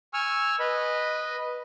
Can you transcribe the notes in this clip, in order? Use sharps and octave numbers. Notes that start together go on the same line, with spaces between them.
G#5 C#6 E6 F6
B4 D#5 B5